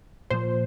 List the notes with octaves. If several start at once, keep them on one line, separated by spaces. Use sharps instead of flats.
A#2 F3 C5